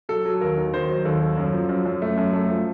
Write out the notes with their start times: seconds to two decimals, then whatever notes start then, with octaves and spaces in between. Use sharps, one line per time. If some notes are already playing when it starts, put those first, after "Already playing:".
0.09 F#3 A4
0.25 F#3
0.41 D#2 A#4
0.57 D#3
0.73 D#3 C5
0.89 F#3
1.05 D#2 A4
1.21 F#3
1.37 F#2
1.53 F3
1.69 F#2
1.86 F#2
2.02 A3
2.17 F#2
2.33 A3
2.49 F3